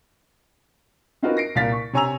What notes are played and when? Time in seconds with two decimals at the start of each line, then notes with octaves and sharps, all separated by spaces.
1.22 C4 D#4 F4 F#4 A#4 B4
1.37 A#6 C7 D7
1.55 C2 A#2 F5 A6 B6
1.72 C#6
1.93 C3 C#5 G#5 A#5 E6 F7